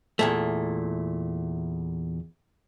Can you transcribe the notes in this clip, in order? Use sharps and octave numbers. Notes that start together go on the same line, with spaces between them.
E2 A#2 A3